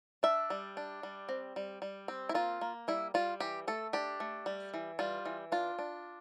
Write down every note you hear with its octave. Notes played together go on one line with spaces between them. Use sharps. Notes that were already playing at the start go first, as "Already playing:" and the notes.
D4 E5
G3
D4
G3
C4
G3
G3
C4
E4
A#3 F4
A#3
G3 E4
G3 F4
E3 G4
A3 A4
D4 G4
A3
G3
E3
G3 F4
E3
D4 F4
D4